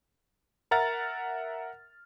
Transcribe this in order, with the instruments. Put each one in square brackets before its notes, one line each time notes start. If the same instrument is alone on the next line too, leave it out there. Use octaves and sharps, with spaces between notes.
[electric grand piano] A#4 E5 F#5 A#5 F6 A6